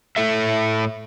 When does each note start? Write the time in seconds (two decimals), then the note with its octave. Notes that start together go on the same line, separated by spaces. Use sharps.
0.16 A2 A4 E5